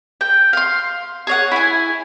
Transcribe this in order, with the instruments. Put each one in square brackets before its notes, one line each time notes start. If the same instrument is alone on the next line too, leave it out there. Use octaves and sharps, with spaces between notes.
[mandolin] G5
F5 C6
G#4 C#5 F#5
E4 G#5